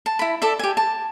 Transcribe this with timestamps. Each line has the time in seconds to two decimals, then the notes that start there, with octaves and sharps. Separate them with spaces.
0.06 A5
0.19 E4 B5
0.42 A4 D5 E5
0.59 G4 G#5
0.77 A5